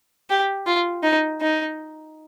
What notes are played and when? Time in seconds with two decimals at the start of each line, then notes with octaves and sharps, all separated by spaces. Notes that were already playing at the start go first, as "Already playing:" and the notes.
0.30 G4
0.67 F4
1.03 D#4
1.41 D#4